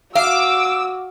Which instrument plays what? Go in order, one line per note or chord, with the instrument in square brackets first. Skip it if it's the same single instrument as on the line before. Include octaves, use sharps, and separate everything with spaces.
[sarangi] F#4 [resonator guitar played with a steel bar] F5 [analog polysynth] D6 [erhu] E6